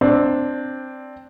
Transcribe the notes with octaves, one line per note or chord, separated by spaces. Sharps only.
C4 D4